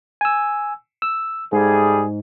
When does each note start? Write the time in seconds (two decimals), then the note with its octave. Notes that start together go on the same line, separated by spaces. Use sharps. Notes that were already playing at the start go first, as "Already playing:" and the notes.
0.21 G#5 E6
1.02 E6
1.52 G#2 G3 A3 G#4